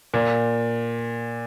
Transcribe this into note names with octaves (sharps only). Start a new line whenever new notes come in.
A#2